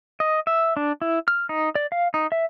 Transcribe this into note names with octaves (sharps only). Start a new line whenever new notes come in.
D#5
E5
D4
E4
F6
D#4
D5
F5
D#4
E5